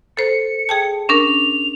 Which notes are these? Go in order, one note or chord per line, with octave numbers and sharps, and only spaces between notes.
A4 C5 C#7
G#4 G5 A5
C#4 D4 A#4 F7